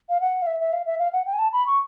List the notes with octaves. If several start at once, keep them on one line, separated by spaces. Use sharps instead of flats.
F5
F#5
F5
E5
E5
F5
E5
F5
F#5
G5
G#5
A5
B5
C#6